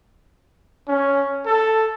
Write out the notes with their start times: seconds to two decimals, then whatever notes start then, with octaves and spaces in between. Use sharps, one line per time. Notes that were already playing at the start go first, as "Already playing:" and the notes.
0.88 C#4
1.46 A4